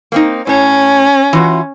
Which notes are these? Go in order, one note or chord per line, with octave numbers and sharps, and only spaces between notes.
A#3 C4 D#4
A2 C#4 C#5
E3 F4 F#4